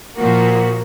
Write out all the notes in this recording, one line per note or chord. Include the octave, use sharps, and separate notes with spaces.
A#2 F3 A#3 F#4